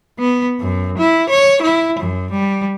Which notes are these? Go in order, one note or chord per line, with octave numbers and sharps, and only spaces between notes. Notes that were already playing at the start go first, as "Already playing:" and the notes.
B3
F#2
E4
C#5
E4
F#2
G3